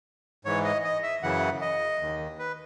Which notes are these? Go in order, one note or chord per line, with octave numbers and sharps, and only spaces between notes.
G#2 E3 C#5
D#5
D#5
E5
F#2 C#3 E3 F#5
D#5
D#2 D#3
B4